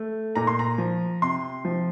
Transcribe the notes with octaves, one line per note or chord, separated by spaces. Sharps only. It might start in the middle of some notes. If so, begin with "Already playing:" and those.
Already playing: A3
A#2 A#5
C6
A#5
F3
C3 C6
F3